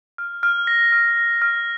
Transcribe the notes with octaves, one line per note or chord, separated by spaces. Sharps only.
F6
F6
A#6
F6
A#6
F6